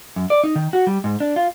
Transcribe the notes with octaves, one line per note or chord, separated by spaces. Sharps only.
F#2
D5
D#4
D#3
F#4
G3
G#2
D4
F4